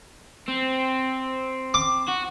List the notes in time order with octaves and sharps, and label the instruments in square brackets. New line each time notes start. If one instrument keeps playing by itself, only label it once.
[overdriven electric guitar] C4
[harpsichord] D6
[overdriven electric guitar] F#4